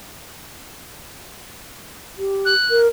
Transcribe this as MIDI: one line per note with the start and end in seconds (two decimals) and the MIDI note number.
2.18 2.54 67
2.45 2.81 90
2.71 2.88 70